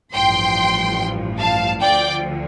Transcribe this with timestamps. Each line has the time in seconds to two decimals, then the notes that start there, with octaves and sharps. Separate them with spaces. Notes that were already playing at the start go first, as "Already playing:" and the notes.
0.13 A1 G2 F3 G5 C6
1.38 F5 A5
1.80 D2 D3 F3 D5 G5